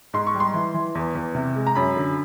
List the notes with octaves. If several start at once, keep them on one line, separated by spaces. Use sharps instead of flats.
G#2 C6
C#6
G3
C6
E3
E3
E2
E2
C3
G#3
A#5
F#2 B5
D3